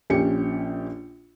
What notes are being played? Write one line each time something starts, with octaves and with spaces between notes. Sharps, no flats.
A#1 C#4 G4 C#7